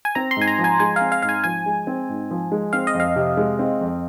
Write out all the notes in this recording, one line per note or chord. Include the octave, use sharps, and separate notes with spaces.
G#5
C4 A#5
C6
G#2 G#5
A#5
F3
G#5
G#3 G#5
C4 F5
F5
G#2 F5
G#5
F3 G#5
G#3
C4
G#2
F3
G#3
C4 F5
D#5
F2
F5
C3
G#3
C4
F2